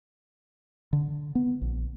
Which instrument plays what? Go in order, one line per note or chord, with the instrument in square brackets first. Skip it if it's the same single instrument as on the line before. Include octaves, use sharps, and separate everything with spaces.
[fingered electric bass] D3
B3
A#1